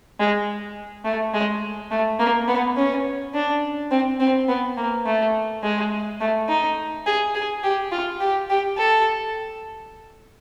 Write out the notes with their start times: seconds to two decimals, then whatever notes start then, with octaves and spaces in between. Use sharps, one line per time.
0.20 G#3
1.05 A3
1.34 G#3
1.91 A3
2.19 A#3
2.48 B3
2.77 C#4
3.34 D4
3.91 C4
4.20 C4
4.48 B3
4.77 A#3
5.06 A3
5.63 G#3
6.20 A3
6.49 D#4
7.06 G#4
7.35 G#4
7.63 G4
7.92 F4
8.21 G4
8.50 G4
8.78 A4